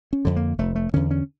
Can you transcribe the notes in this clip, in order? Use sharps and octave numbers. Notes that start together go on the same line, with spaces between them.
C#4
F2 D3
A#3
F1 A3
A3
E2 D3 C#4
C#4